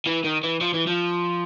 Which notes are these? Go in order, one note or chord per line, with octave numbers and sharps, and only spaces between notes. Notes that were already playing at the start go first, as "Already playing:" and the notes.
E3
D#3
E3
F3
E3
F3